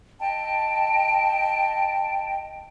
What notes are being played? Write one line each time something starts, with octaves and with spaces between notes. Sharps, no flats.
D#5 G5 A5